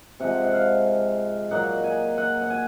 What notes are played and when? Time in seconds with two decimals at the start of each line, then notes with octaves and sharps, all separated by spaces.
0.20 C3 F3 G#3 F#5
0.44 F#5
0.53 F5
1.51 A#2 F#3 A#3 D#4 F#5
1.84 G#5
2.18 F#5
2.41 F#5
2.50 G#5